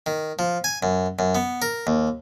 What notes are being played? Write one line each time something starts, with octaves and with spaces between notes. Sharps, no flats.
D#3
F3
G#5
F#2
F#2
B3
A#4
D#2